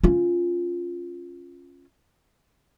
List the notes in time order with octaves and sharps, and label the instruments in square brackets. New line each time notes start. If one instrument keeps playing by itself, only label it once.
[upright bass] C#4 F4